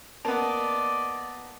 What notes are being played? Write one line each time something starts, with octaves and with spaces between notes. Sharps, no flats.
A#3 B3 D5 D#5 A5